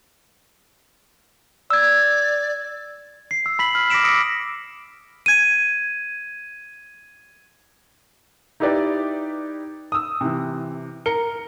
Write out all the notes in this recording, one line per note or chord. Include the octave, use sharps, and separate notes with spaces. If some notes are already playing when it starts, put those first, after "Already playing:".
D5 E6 G#6
C7
E6
B5 B6 F#7
F6
D6 A#6 B6 D7 E7
D#6 E6 A#6 B6 C#7 D7
G#6 D#7
D#4 E4 G4 B4 D5
D#6 E6
C3 E3
A#4 C#7 G7